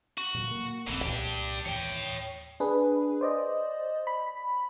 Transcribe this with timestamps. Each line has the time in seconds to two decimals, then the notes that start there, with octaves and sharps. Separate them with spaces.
0.18 F#4
0.34 A#2 D3 F#3
0.51 A#3
0.87 D1 A#1 A2 E3 C4
1.03 C2 A#2 D4 G4
1.66 D#2 A2 E3 C#5 G5
2.60 D4 G#4 B4
3.21 C5 D5 D#5
4.07 B5